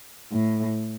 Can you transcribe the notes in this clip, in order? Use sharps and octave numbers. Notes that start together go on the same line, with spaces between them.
A2